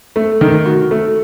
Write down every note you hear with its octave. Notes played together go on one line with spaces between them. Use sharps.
A3
D#3
F#4
A3